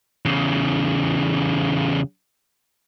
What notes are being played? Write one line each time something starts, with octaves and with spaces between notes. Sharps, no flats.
E2 C#3